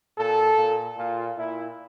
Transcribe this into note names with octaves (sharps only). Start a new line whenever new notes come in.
A#2 A4
A#2
A#2 F4
A#2 E4